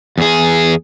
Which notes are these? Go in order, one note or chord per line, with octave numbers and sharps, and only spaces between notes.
E2 G#4